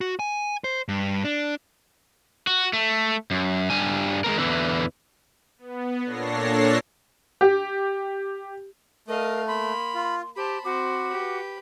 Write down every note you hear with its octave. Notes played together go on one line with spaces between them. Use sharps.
F#4
G#5
C5
G2
D4
F#4
A3
F#2
G2 G3 G#5
G#3 B3 A#4
E2 D3 E3
B3
A#2 D4 A4 C#5 A#6 C7
G4
A3 A#4 D#5 F5
A#3 B5 C6
F4
G4 C5 A5 B5
C4 F#4 C5 D6
G4 B4